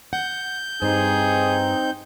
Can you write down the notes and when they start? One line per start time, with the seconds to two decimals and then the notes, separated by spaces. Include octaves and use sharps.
0.13 F#5 G6
0.82 G2 C4 D#4 G#4 C5